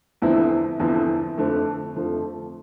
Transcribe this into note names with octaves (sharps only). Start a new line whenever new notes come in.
E2 D3 F3 C4 E4
E2 D3 F3 C4 E4
F2 D3 F3 A3
F2 D3 F3 A3